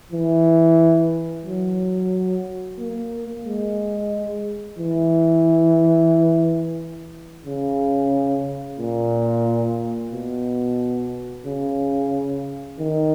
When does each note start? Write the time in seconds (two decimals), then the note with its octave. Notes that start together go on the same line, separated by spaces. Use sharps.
0.12 E3
1.45 F#3
2.79 A#3
3.45 G#3
4.79 E3
7.46 C#3
8.79 A#2
10.12 B2
11.46 C#3
12.80 D#3